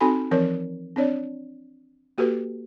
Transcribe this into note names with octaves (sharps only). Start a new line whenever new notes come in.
C4 D#4 F#4 A4 G#5 B5
E3 F3 C4 A#4 C#5
C4 D4 C#5 D5
A#3 F#4 G4 A4 B4